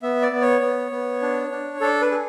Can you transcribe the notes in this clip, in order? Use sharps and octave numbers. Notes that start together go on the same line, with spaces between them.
B3 E5
D5
B3
C#5
B3
B3
D4
D4
D4 A4
B4
G#4